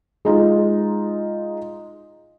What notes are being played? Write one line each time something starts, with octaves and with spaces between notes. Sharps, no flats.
G#3 D#4 F4